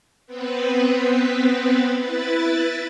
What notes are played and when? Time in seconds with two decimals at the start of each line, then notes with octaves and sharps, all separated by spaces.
0.26 B3 C4 B4
1.99 E4 B4 A6